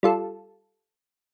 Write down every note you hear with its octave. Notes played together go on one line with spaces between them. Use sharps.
G3 F4 A4